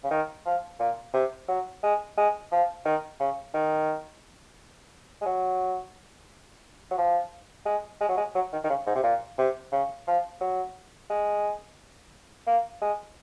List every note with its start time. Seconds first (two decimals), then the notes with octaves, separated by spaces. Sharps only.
0.04 C#3
0.11 D#3
0.46 F3
0.80 A#2
1.14 C3
1.48 F#3
1.83 G#3
2.18 G#3
2.52 F3
2.85 D#3
3.20 C#3
3.54 D#3
5.22 G#3
5.26 F#3
6.91 F#3
6.98 F3
7.66 G#3
8.01 G#3
8.09 F#3
8.17 G#3
8.35 F#3
8.53 D#3
8.64 D#3
8.70 C#3
8.87 G#2
8.95 C3
9.03 A#2
9.38 C3
9.72 C#3
10.07 F3
10.41 F#3
11.10 G#3
12.47 A#3
12.81 G#3